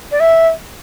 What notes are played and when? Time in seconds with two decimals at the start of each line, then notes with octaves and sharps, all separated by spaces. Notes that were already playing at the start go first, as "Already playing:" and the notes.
0.11 D5
0.20 E5